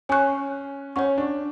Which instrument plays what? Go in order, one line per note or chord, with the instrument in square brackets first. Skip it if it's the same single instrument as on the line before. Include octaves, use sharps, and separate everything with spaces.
[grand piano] C#4 [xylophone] C#5 G#5 C#6 F#6
[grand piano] C#4 [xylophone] C#5 F#5 C#6
[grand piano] D4